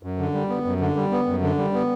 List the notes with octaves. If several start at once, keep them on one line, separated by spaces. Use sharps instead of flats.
F#2
D3
G3
B3
F#2
D3
G3
B3
F#2
D3
G3
B3